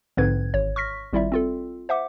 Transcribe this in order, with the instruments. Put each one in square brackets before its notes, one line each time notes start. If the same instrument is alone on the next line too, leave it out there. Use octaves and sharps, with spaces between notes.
[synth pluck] A#1 G#2 D3 C4 B4 G#6
G#1 C#5
C#6 F6 A#6 B6
G#1 G3 E4 F4 D5 E5
C4 F4 A4
C5 E5 F#5 D6